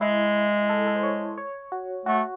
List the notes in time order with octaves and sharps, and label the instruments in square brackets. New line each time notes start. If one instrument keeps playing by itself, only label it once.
[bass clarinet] G#3 [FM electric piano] E4
[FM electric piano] A4
A4
C5
C#5
C#5
F#4
[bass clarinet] A3 [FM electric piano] F#4